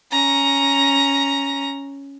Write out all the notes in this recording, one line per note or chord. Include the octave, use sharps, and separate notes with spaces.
C#4 A#5